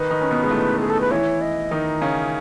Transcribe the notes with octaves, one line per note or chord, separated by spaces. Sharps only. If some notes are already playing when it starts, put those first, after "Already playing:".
Already playing: D#3 D#4 B4
D#3 D#4
C#4
B2 B3
G#3
A2 A3
G#4
A4
B4
E3 E4 C#5
D#5
D#3 D#4
C#3 C#4